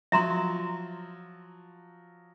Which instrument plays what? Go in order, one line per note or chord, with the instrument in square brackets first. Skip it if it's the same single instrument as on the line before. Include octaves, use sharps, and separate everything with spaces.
[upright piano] F3 F#3 [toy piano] E5 A#5 C6